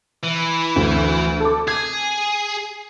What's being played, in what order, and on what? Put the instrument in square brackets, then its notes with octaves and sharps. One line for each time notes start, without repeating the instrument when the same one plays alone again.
[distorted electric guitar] E3
[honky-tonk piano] D2
A4 D6
[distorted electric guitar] G#4 [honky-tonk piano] G#6